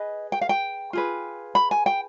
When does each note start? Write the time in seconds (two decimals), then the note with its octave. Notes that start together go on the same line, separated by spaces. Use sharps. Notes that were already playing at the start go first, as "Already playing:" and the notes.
Already playing: G#4 B4 D#5
0.32 G5
0.41 F5
0.49 G5
0.93 F4 G#4 B4
1.55 B5
1.71 G#5
1.86 G5